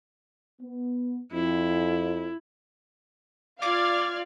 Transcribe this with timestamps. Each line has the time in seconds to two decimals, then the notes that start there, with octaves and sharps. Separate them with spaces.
0.62 B3
1.32 F2 E4
3.62 F4 D5 F5 D6 F6 G#6